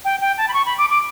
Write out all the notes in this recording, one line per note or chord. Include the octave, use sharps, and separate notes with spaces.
G5
G5
A5
B5
C#6
B5
D6
D6